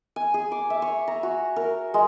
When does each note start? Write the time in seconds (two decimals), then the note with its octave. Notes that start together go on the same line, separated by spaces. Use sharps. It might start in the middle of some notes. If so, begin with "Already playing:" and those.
0.16 G#5
0.34 G#4
0.52 D6
0.70 E5
0.82 C#5
1.08 A#5
1.23 F#4
1.56 A#4
1.94 G#3